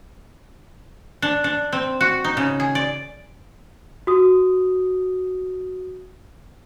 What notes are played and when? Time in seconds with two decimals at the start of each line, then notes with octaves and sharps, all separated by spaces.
1.22 D4
1.44 D4
1.73 C4
2.01 F#4
2.24 D#4
2.37 C#3
2.60 G#4
2.75 D5
4.07 F#4 D#6